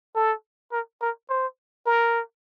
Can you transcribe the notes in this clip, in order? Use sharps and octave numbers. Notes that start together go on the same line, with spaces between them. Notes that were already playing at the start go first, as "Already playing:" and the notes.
A4
A#4
A#4
C5
A#4